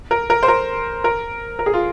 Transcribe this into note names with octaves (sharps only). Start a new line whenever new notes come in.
A#4
A#4
C5
A#4
A#4
A#4
G#4
F4